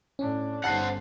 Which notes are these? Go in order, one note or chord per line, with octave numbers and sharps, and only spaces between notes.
A2 C#4 D4
G1 C5 F#5 A5 F#6 C7